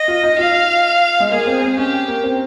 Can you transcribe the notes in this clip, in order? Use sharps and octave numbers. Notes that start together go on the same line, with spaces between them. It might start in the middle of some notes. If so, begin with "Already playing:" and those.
Already playing: D#5
F4
D#4
F4 F5
G#3
A#3 G#4
C4
C4
C#4 G4
A#3
C4